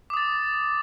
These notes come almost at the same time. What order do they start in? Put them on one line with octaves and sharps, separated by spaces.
D6 D#6 A6